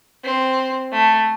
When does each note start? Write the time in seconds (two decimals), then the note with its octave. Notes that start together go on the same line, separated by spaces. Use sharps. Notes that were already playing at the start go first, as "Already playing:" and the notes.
0.24 C4
0.92 A3